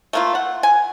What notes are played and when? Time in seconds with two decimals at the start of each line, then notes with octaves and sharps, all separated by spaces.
0.13 A3 A#3 F4
0.35 F#5
0.63 G#5